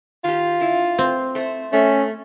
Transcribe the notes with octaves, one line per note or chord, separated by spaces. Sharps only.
D#3 F4 G4
D3 E4
C4
A3 C5
A3 C#4 E5